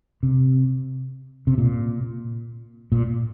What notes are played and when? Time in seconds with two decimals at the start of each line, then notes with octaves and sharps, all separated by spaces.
0.23 C3
1.47 C3
1.58 A#2
2.92 A#2